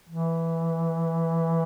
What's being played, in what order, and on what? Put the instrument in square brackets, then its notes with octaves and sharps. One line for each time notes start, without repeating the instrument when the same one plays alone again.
[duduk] E3